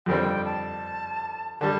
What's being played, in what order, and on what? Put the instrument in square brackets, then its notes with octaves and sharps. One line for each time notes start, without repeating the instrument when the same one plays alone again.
[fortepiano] F2 D3 G3 C4 [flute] G5
[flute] A5
[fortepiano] D3 G3 [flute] A5